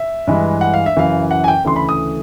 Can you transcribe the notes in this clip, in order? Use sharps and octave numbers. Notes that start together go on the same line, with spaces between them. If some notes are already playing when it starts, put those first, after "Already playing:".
Already playing: E5
G2 E3 G#3
F#5
F5
E5
F#2 C#3 E3 F5
F#5
G#5
G5
D2 C#3 E3 A3 C6
B5
D#6